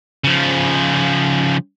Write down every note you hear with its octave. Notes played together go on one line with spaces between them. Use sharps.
C#3 F3